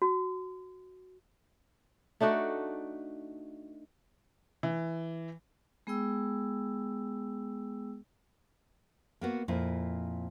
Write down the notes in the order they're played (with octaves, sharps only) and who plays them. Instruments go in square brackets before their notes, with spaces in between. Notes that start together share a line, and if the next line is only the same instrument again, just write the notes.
[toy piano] F#4
[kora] A3 D4 D#4 F#4
[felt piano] E3
[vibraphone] G#3 B3 G#4 G5 E6
[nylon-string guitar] A#3 B3 F#4
F2 A#2 E4